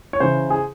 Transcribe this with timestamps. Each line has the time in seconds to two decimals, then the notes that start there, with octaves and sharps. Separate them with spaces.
0.13 C#5
0.20 C#3 E3 C5
0.50 G#4